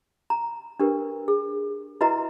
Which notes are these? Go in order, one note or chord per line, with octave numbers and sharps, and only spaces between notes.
A#5
D4 G4 A#4 B4
G#4
E4 F#4 B4 D#5 E5 A#5